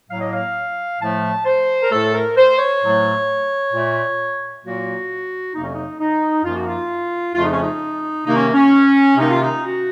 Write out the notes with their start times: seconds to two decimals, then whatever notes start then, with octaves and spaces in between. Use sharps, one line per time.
0.09 A2 F#3 A#3 F5
0.20 D#5
0.33 F5
0.99 A2 F3 A3 A5
1.45 C5
1.83 A#4
1.90 A2 A3 A4
2.14 A#4
2.36 C5
2.59 C#5
2.82 A2 F#3 A3
3.72 A#2 A3
4.63 A#2 F#3 A#3 F#4
5.53 F2 C3 F#3 A#3 D#4
5.63 C#4
5.73 D#4
5.99 D#4
6.44 F#2 F3 A#3 F4
6.55 F#4
6.66 F4
7.35 F2 C#3 F3 A3 F4
7.43 D#4
7.53 C#4
7.61 D#4
8.26 C3 D#3 A#3 D#4
8.36 C#4
8.53 C#4
9.16 C3 D#3 A#3 D#4
9.29 F4
9.42 D#4
9.63 F#4